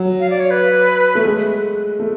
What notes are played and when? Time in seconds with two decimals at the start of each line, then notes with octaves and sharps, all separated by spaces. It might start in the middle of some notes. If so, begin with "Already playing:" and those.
Already playing: F#3
0.20 F5
0.30 D5
0.40 C#5
0.50 B4
1.15 A3
1.25 G#3
2.00 A3